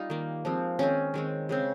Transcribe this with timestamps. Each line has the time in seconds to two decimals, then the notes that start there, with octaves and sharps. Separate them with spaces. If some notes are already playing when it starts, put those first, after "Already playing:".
Already playing: G3 D#4 F4
0.10 D#3 A#3
0.45 F3 G#3 C4
0.79 D#3 G#3 C4 C#4
1.14 D#3 G#3 C4
1.49 C#3 G#3 C4